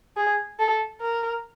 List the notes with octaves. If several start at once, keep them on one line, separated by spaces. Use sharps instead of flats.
G#4
A4
A#4